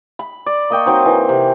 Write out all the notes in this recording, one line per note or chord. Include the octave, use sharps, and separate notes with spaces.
B5
D5
A#3 D#5 G5 C#6
F#3 C4 D#4
E3
C3